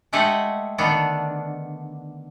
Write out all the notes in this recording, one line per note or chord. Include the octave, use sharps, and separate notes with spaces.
G#3 A3 G4 G#4 D#5 F#5
D3 D#3 B3 D4